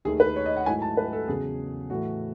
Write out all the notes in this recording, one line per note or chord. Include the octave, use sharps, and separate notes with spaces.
D#2 D#3 A3 G#4
B4
C#5
D#5
F#5
G#2 F#3 A3 E4 G#5
A5
B4
A4
E2 C#3 F#3 G#4
A2 E3 A3 F#4